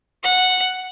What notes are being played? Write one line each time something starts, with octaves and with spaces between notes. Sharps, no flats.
F#5